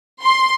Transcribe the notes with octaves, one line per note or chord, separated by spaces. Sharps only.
C6